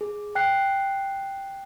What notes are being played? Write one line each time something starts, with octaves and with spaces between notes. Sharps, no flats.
G#4
G5 F#6 C7